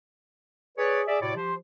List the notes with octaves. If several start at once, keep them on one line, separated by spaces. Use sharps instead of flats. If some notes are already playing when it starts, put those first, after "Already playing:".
G#4 B4 C#5 D5
G#4 D5 E5
A2 C3 E4 F#4 C#5 D5
F3 F4 G4 C5